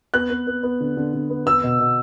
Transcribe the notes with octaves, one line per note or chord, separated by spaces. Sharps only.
B3 F#6
B3
B3
B3
D3
D3
D3
B3
B3 E6
B2
B2